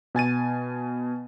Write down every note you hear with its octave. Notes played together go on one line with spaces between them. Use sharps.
B2 G#5 A6 D#7